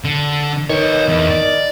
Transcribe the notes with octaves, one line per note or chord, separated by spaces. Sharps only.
D3
D#3 B4 C#5
E2
D5